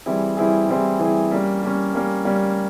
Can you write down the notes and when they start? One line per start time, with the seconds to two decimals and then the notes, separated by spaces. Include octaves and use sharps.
0.06 E3 G3 C4 E4 G#4
0.37 E3 G3 C4 E4 G#4
0.68 E3 G3 C4 E4 G#4
0.99 E3 G3 C4 E4 G#4
1.31 G3 A#3 C#4
1.62 G3 A#3 C#4
1.94 G3 A#3 C#4
2.25 G3 A#3 C#4